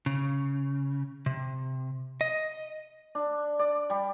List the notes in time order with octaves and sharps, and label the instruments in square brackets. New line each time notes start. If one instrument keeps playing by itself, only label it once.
[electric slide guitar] C#3
C3
D#5
[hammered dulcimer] D4
D5
G3